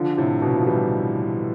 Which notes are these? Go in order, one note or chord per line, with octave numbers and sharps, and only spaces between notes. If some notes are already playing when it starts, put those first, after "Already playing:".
Already playing: D3 F3
A2 C3
B2
F3
E3 G3